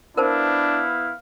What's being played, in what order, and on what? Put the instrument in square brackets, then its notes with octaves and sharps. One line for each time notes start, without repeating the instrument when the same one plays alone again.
[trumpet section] B3 E4 F5 [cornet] D4 [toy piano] A#4 C5 A5